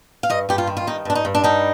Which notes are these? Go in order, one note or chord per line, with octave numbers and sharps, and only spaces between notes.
F5
G2 D#5
G2 G4
F4
D#3
F4
G2 D#4
G2 D4
D#4
G2
D4
G3 D#4